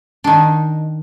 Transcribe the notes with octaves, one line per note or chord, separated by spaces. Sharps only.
D#3 D4